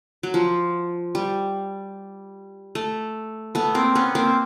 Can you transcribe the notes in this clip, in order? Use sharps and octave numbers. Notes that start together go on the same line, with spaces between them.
F#3
F3
G3
A3
A3 B3
A#3 C4
B3 C#4
A#3 C4